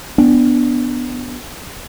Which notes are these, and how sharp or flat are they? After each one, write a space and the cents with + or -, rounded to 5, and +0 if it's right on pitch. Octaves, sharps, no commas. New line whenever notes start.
B3 +0 D4 +0